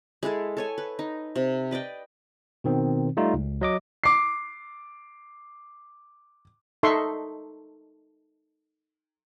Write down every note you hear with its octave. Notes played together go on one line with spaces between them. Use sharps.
G#3 E4 G#4 A4
A4 C#5 G#5
B4
D#4
C3
B4 D5 D#5 G5
B2 D#3 C4
G3 A3 D#4 F4
C#2
F#3 D#5 D6
D6 C7
D#4 A4 E5 C6 C#6